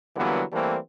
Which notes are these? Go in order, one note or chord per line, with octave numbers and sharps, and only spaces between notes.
D3 E3 F#3 G3 A#3 B3
E3 G3 A3 A#3 C4